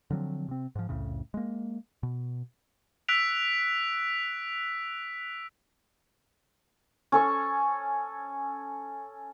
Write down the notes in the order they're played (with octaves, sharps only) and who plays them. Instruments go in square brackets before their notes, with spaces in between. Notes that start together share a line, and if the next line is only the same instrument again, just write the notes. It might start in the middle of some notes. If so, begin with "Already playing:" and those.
[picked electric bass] D3 F3 F#3 C4
C3 C4
G#2 F3
C2 F2 A2 C#3
G#3 A#3
B2
[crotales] E6 F#6 B6 D7 F7
[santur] C#4 A4 C#6